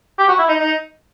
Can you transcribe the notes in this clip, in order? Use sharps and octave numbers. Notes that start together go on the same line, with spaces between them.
G4
F#4
E4
D#4
D#4